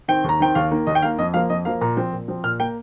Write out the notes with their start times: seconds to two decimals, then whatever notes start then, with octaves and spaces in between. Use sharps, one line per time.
0.08 D#3 C4 G5
0.24 D#2 A#5
0.40 D#3 C4 G5
0.55 D#2 F5
0.71 D#3 A#3
0.87 D#2 D#5
0.95 G5
1.02 D#3 A#3 F5
1.18 F2 D#5
1.34 F3 A#3 F5
1.50 F2 D#5
1.65 F3 A#3 F5
1.81 A#2 A#5
1.97 F3 C4
2.12 A#2
2.28 F3 C4
2.44 A#2 F6
2.60 A#3 G5